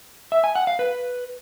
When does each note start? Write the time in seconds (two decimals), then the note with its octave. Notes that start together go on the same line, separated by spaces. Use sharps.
0.32 E5
0.44 G#5
0.55 F#5
0.67 F5
0.79 B4